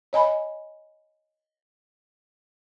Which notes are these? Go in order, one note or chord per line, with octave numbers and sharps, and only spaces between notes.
C#5 D#5 G#5 B5